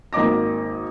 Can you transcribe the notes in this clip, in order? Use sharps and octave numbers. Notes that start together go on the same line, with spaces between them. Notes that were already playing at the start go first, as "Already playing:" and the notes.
G#1 A#3 D#4 D6 A#6